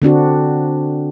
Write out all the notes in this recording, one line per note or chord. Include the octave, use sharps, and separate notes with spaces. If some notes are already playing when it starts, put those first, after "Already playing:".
D3 C4 D4 F#4